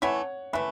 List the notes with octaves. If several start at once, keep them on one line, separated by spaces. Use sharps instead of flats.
E3 A3 E4 C#5 F#5
E3 A3 B4 E5